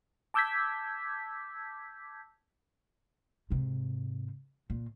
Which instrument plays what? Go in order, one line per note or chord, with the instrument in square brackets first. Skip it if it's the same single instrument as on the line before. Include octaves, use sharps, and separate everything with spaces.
[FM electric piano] A5 D6 E6 G6 G#6 B6
[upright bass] G#2 C3
A#2